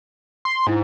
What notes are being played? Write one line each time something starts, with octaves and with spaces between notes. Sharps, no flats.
C6
G#2 D4 E4